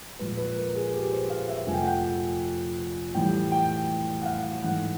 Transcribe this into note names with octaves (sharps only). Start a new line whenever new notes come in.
A#2 F3 G#3 B4
B4
A#4
G#4
G4
C5
F5
E5
F2 C3 F3 A3 G#5
G5
F#5
G5
A2 E3 G3 G5
G5
F#5
F5
G#2 E3 A3 F#5